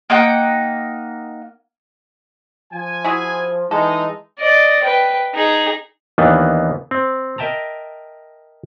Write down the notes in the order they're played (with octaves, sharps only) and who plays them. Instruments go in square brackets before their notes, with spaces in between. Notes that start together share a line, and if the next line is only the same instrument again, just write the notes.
[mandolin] A#3 D#4 F#5 G5
[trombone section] F3 [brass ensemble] G#5
[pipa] E4 F#4 G#4
[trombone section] E3 G#3 [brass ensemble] D#4 [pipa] A4
[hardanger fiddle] D5 D#5
B4 G5
D#4 G#4
[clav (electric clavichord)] D#2 E3 A#3 B3 D4 D#4
C4
A#4 D#5 E5 G5 A5 A#5